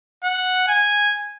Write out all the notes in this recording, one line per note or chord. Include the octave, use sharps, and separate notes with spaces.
F#5
G#5